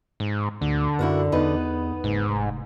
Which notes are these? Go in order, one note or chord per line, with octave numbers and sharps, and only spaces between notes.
G#2
D2 D3
F#2 E4 F#4 A#4
E2 B3 D#4 B4
F#1 G#2
F1